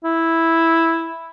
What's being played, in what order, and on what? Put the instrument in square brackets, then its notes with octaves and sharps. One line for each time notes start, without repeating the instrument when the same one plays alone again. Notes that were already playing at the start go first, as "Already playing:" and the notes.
[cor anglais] E4